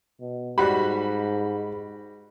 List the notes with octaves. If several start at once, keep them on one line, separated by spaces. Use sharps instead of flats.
B2
G#2 G3 F#4 G4 B5 F#6